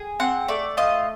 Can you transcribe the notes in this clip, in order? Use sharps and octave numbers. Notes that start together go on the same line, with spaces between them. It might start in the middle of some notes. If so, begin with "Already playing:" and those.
Already playing: G#4
C4 F#5
A3 D5
F4 D#5